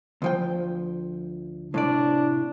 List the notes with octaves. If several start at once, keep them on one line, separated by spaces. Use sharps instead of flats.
D2 F3 G5
A2 C3 D4 D5